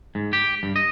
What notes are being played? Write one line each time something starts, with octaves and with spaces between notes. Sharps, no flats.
G#2
G4
G2
D#5